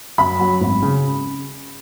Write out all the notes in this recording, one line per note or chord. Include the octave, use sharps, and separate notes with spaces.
F#2 B5
F#3
G#1
C#3